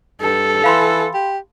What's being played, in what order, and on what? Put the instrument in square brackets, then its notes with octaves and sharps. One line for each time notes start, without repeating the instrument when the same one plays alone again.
[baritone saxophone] G2 [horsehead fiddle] A4
[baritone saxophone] E3 [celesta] F5 B5 C6
[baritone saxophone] G4